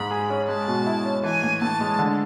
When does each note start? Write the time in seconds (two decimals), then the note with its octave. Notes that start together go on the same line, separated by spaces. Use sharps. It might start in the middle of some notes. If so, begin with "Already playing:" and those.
Already playing: G#2 G#3 B5
0.11 G#4
0.30 C#4
0.48 G#3 A5
0.67 B2
0.86 E4
1.05 C#4
1.23 E3 G#5
1.43 A2
1.62 A2 A5
1.81 G#3
1.99 D3